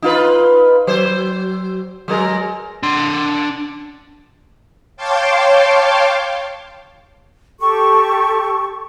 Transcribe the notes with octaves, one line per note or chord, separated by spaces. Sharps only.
D#4 F4 B4
F#3 C5
F#3 G#3 A#4
D4 C6
C#5 F5 G5 A5 C6 D6
G4 A4 C#6